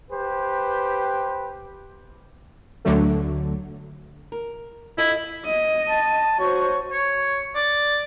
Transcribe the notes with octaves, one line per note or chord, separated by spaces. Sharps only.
G4 B4 C5
D2 D3 F#3 A3
A#4
E4 F4 A4 D#5
D#5
A5
F#4 C5 C#5
C#5
D5